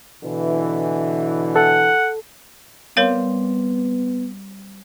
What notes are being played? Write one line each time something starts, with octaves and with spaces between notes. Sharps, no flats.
B2 D3 E3
A4 F#5
G3 B3 C4 A#4 C#5 F5